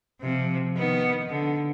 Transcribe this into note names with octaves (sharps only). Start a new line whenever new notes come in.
C3 F3
D#3 B3
D3